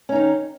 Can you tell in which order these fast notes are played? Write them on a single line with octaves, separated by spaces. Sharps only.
C#4 D#4 D#3